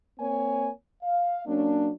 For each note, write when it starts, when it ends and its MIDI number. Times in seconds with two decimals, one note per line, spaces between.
0.19 0.70 58
0.19 0.70 60
0.19 0.70 73
0.19 0.70 80
1.03 1.43 77
1.46 1.90 54
1.46 1.90 58
1.46 1.90 61
1.46 1.90 62